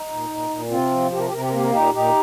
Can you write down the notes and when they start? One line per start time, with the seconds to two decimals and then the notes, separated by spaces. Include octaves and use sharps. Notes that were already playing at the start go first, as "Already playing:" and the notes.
Already playing: D#4
0.09 A#2
0.29 A#2
0.50 A#2
0.70 C3 C4 F4
0.91 F3
1.12 C3 G4
1.19 A#4
1.26 G4
1.32 C3 A#4
1.41 G4
1.48 A#4
1.53 A#3 G4
1.63 A#4
1.71 A#2 D#4 G4
1.94 A#2 D#4 G4